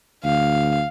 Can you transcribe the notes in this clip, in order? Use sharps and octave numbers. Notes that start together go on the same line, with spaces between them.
D2 F5